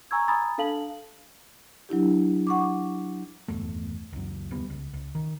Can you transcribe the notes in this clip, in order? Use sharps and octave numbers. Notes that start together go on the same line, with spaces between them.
G#5 A#5 C#6 E6 G#6
G#5 A#5 B5 D#6 G#6 A6
D4 A4 F5 A5 F#7
F#3 D4 E4 G4
F#5 C#6 D6
D1 G1 E2 A3
C#2 F#2
E1 D2 G3 B3
C#2
C#2
D#3